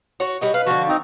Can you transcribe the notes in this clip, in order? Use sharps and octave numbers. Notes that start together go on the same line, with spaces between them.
F#4 C#5
G3 F#4 D#5
B4 F5
D3 F3 F#4
C4 D#4